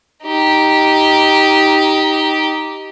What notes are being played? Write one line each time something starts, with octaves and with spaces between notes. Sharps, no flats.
D#4 G4